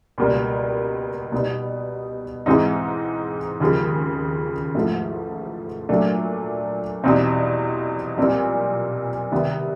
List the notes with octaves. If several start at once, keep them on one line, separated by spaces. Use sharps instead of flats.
C#2 B2 G3 A#3
B2 G3 B3 D#4
G#2 E3 G#3 C4 D#4
D#2 C#3 F3 G#3
A1 G#2 F3 A3
A#2 F#3 A3 D4
E2 B2 G3 C4 D#4
B1 A#2 G3 C4
C3 D#3 G3 B3